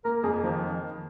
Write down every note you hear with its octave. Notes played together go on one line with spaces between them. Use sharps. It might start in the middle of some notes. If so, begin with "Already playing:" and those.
A#3 A#4
F2 G#4
D#3 F3